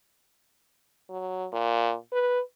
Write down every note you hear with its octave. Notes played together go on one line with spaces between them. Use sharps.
F#3
A#2
B4